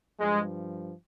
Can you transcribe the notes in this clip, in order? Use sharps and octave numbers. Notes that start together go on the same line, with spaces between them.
G2 F3 G#3